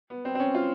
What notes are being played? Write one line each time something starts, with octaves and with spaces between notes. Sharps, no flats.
B3
C4
C4
C#4
F4